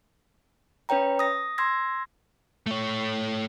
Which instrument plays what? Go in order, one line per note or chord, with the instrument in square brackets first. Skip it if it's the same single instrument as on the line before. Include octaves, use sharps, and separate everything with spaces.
[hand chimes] C#4 B4 C#5 G5 A#5
D#6 A#6
C6 E6 G#6 A#6
[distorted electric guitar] A3 C#5